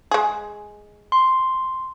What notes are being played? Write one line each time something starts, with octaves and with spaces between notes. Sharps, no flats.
G#3 G#4
C6